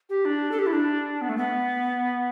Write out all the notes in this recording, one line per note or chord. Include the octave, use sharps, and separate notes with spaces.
G4
D4
A4
G4
E4
D4
B3
A3
B3